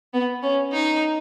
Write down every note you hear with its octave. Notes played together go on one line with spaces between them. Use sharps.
B3
C#4
D#4